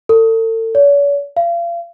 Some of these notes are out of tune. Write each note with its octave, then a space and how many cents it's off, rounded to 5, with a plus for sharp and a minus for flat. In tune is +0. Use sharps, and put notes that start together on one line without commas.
A4 +40
C#5 +45
F5 -35